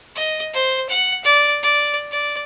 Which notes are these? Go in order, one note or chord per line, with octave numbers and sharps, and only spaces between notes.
D#5
C5
F#5
D5
D5
D5